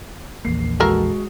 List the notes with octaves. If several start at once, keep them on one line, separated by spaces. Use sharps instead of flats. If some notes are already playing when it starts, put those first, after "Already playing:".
A#1 E2 A#3 C7
G#3 F#4 A4 A#4